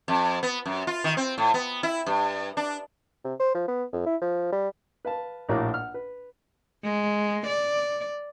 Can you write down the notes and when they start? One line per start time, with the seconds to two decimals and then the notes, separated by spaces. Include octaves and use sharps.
0.08 F2
0.43 B3
0.66 F#2
0.87 F4
1.04 D#3
1.17 C4
1.38 A2
1.54 B3
1.83 E4
2.06 G2
2.57 D4
3.24 C3
3.40 C5
3.55 F3
3.68 B3
3.93 F2
4.06 E4
4.21 F3
4.52 G3
5.05 B4 F5 A5
5.49 A#1 A2 A#3 F#4 D6 F#6
5.74 F#5 F6
5.94 B4
6.84 G#3
7.47 D5